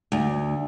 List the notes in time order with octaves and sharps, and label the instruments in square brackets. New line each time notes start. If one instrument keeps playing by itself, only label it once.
[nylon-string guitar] D2